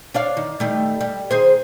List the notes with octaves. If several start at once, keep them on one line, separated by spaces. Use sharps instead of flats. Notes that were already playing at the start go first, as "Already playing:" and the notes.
D4 C#5 F5
D#3
D#3 G3 A3
G3
D#3 G#4 C5